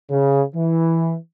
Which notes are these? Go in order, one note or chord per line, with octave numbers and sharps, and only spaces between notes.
C#3
E3